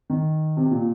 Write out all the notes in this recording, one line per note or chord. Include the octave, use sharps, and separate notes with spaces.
D#3
C3
A#2